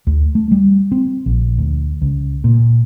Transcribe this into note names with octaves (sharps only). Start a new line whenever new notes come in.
D2
A3
G3
C4
A#1
D2
C#2
A#2